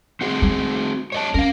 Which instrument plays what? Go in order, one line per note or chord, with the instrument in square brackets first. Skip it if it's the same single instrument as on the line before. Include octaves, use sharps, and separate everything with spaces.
[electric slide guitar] C4 F#4 G#4
[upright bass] G#3
[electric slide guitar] C#5 D#5 A5
[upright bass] C#4 [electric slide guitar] A#4 F5